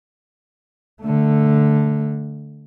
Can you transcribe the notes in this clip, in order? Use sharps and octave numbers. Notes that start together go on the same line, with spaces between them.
D3 A3